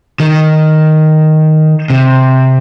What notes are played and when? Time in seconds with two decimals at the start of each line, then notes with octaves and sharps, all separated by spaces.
0.20 D#3
1.90 C3